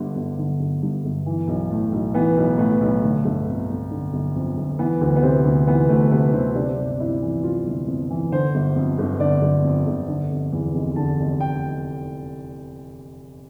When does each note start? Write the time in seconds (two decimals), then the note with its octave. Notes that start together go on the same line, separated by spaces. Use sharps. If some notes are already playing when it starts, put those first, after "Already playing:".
Already playing: G1 G2 D3
0.16 G1
0.39 D3
0.60 G1
0.82 G2
1.04 G1
1.26 E3
1.48 B1
1.71 A2
1.92 B1
2.14 E3 B3
2.37 B1
2.58 A2 B3
2.81 B1
3.03 D3 A3
3.25 G1
3.47 F2
3.69 G1
3.91 D3
4.13 G1
4.35 F2
4.57 G1
4.79 E3 B3
5.01 D2
5.16 B3
5.23 C3 C4
5.45 D2
5.67 E3 B3
5.89 D2 A3
6.11 C3 B3
6.33 D2 C4
6.55 C3 D4
6.77 G1
7.00 F2 E4
7.22 E3
7.43 C3 F4
7.66 G1
7.87 F2
8.10 E3
8.32 D3 C5
8.54 G1
8.75 F2
8.99 G1
9.20 D3 D5
9.42 G1
9.64 F2
9.86 G1
10.08 D3
10.31 F1
10.52 E2
10.74 F1
10.96 D3 A5
11.19 F1
11.40 G5